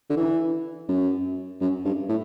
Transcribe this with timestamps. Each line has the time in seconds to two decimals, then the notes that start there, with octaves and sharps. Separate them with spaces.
0.10 D3
0.17 E3
0.89 F#2
1.61 F#2
1.85 G2
2.09 A2